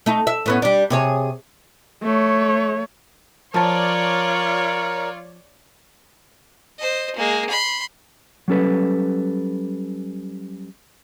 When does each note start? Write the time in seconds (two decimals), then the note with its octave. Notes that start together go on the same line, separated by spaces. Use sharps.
0.06 A3 D#4
0.27 E5
0.46 A2 B3 C#4
0.62 G3 D4
0.90 C3 G#4 C#5
2.04 A3 C#5
3.54 F3 F4 A#4 C#5 D5 A5
6.78 C5 D#5
7.15 G#3 A#3
7.49 B5 C6
8.48 F#3 G3 C#4 A4 B4